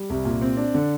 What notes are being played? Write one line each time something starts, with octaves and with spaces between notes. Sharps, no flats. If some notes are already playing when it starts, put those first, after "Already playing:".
Already playing: G3
C2
A#2
C4
D4
D3